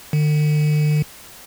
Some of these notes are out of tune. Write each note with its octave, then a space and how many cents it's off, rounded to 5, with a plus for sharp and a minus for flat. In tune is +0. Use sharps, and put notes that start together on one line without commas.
D3 +45